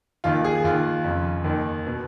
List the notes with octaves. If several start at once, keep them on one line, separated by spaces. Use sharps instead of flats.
D#2 D#3 F4
G#4
D#2 D#3 F4
F2 C#3
D#2 D#3
B2